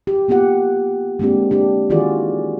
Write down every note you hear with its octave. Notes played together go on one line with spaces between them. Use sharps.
G4
A#3 B3 F4 G4 F#5
G#3 A#3 C4 D4 G4
D4 G4
D#3 E3 F4 F#4 G#4 D5